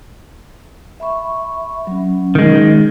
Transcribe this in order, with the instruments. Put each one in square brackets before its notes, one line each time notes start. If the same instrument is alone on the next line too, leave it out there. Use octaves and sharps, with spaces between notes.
[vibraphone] E5 B5 C#6
F#3 C#4
[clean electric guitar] D#3 G#3